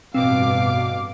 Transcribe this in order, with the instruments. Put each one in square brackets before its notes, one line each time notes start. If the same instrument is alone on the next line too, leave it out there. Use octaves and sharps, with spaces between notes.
[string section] A1 G2 D6 [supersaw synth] B2 [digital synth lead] C4 [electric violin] F5